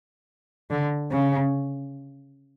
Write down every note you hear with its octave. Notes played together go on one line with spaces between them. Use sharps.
D3
C#3